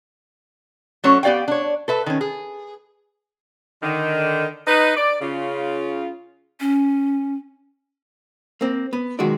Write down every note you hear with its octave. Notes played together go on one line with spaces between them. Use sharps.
F#3 A3 C#4 C#5
B3 G4 D5 F5 G5
D4 C#5
A4 B4 E5
D#3 C#4
G#4
D3 D#3
D#4 B4
D5
C#3 F4
C#4
A#3 C4
B3
B1 D#3 G#3 F4 F#4 D5